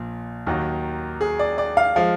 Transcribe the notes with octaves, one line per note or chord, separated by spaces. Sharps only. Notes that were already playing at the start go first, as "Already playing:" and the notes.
Already playing: A#1 A#2
D#2 D#3 F#3
G#4
D5
D5
F5
F3 G#3 F5